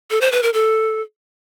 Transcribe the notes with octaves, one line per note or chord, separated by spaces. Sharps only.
A4
C5
B4
A#4
A4